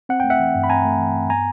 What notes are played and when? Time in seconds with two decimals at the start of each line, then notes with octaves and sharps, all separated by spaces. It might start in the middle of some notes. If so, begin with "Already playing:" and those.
0.09 C4 F#5
0.20 A3 G5
0.30 E5 F#5
0.39 E3
0.55 G2
0.64 B5
0.70 C4 G#5 A#5
0.85 A3
0.99 E3
1.14 G2
1.29 B3 G#5 A#5